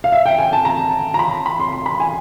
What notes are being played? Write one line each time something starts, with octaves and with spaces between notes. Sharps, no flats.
F5
E5
G5
G#5
A5
A#5
A#5
B5
B5
C6
C6
B5
G#5